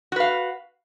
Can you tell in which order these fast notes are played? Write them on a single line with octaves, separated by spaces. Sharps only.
F#4 B4 F5